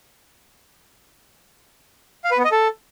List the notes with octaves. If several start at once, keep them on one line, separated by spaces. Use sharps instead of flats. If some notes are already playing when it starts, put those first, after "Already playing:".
F5
B4
B3
D#5
A4